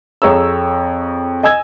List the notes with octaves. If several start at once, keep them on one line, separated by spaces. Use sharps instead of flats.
F2 G#4 C#5 A#5 E6
D#5 G#5 E6 G#6